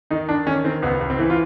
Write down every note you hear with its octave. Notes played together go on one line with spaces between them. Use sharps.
D#3 D#4
D#3 D4
D#3 C#4
D#3 C4
C#2 B3
C#2
C4
E3
F4